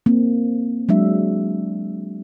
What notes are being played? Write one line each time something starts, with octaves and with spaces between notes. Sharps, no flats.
A#3 C4
F#3 G#3 D4 E5